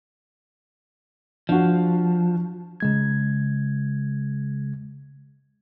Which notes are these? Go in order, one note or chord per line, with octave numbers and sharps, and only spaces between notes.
F3 D4 F#4
C#3 G#3 G#6